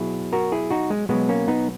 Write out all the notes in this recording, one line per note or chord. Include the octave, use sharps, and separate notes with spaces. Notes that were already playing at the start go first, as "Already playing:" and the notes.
Already playing: B2 F#3 E4 G#4
F#4 A#4
E4 G#4
D#4 F#4
G#3
B2 F#3 G#3 B3
A#3 C#4
B3 D#4